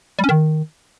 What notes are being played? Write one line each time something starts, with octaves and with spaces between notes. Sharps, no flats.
G3
C#4
D#3